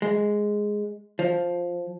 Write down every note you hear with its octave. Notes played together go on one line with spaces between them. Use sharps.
G#3
F3